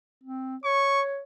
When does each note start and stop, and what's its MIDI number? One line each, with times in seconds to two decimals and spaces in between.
0.24 0.56 60
0.64 1.22 73
0.64 1.02 85